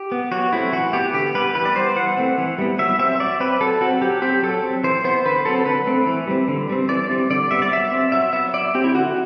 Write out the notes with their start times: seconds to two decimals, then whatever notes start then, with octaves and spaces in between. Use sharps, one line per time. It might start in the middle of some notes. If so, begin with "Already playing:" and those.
Already playing: G4
0.12 B3
0.32 F#3 F#4
0.52 A3 C4 E4
0.72 E3 F#4
0.93 B3 G4
1.14 D3 G4
1.34 G3 B3 B4
1.55 E3 B4
1.65 D5
1.76 G3 B3 C5
1.96 E3 F#5
2.17 A3 C4
2.38 E3
2.58 G3 B3
2.79 F#3 E5
2.99 C4 E5
3.19 F#3 D5
3.40 C4 B4
3.61 F#3 A4
3.81 C4 F#4
4.02 F#3 G4
4.22 C4 G4
4.43 F#3 A4
4.63 C4
4.84 E3 C5
5.04 B3 C5
5.25 D3 B4
5.45 F#3 C4 A4
5.66 D3 B4
5.87 A3 C4
6.07 E3
6.27 G3 C4
6.48 D3
6.69 G3 C4
6.89 E3 D5
7.10 G3 C4
7.30 D3 D5
7.51 G3 B3 E5
7.62 D5
7.72 F#3 E5
7.92 C4
8.12 F#3 E5
8.33 B3 E5
8.54 F#3 D5
8.75 C4 G4
8.84 E4
8.95 D3 F#4